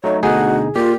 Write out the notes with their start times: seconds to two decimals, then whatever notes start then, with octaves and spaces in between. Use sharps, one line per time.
0.04 F#3 A3 D#4 C#5
0.23 D2 B2 D3 D#4 G#4 F#5
0.76 A#2 F4 G4